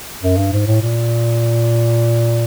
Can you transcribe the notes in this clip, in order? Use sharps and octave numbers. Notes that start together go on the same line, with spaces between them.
F#2
G2
G#2
A2
A#2